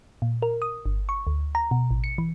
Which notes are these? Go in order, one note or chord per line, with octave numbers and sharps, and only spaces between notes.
A#2
A#4
D#6
G1
C#6
D2
A#5
B2
A1
C#7
E3